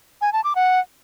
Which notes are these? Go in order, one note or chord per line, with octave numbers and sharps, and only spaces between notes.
G#5
A5
D6
F#5